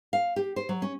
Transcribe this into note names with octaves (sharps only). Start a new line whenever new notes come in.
F5
G4
C5
F#3
C#4